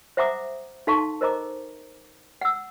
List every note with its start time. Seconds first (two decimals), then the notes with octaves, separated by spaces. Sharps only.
0.17 C5 E5 F#5 A#5 D6 D#6
0.87 D#4 A4 F5 A5 C6 C#6
1.21 A#4 C5 D#5 A#5 D6
2.41 F#5 E6